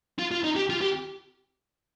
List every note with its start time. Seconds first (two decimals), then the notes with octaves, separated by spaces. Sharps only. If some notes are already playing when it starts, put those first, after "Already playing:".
0.19 F4
0.32 F4
0.44 D#4
0.56 G4
0.70 F4
0.82 G4